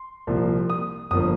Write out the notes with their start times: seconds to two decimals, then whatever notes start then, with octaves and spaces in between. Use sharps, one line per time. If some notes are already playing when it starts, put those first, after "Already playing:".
Already playing: C6
0.27 C2 A#2 F3
0.70 D#6
1.11 G1 F3 A#3 D#6